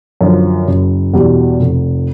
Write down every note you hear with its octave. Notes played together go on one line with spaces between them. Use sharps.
F#2 D3 F3
F#1
E2 B2 G3
F1